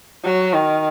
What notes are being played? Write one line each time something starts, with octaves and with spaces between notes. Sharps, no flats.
F#3
D#3